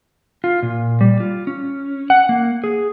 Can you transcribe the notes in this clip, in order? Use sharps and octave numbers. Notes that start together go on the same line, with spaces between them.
F4
A#2
G3
F4
C#4
F#5
A#3
G#4